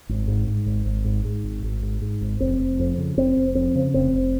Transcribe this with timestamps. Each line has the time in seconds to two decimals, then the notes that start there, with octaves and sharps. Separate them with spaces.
0.09 G#1
0.28 G#2
0.47 G#2
0.66 G#1
0.86 G#1
1.05 G#2
1.25 G#2
1.44 G#1
1.63 G#1
1.82 G#2
2.02 G#2
2.21 G#1
2.40 F1 C4
2.59 F1
2.79 F2
2.98 C#3
3.17 F1 C4
3.37 F1
3.55 F2 C4
3.75 C#3
3.94 F1 C4
4.13 F1